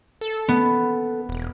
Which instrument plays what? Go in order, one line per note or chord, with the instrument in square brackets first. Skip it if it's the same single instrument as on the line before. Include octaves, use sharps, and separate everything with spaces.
[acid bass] A4
[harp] B3
[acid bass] E1